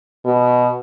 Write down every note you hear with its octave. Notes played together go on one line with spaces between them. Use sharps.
B2